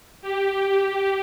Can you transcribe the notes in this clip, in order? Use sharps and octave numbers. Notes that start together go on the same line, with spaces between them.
G4